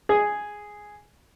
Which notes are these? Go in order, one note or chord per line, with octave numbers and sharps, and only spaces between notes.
G#4